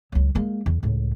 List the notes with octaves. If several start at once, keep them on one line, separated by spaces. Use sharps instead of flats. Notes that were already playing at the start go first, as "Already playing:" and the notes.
C#2 F#3
G#3 A#3
E2
C#2 A2